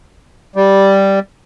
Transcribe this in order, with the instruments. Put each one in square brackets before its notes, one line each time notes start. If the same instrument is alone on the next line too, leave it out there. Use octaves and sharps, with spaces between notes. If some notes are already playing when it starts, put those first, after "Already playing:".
[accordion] G3